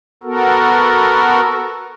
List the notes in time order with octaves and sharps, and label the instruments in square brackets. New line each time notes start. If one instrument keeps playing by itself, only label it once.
[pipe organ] B3 F#4 A4 A#4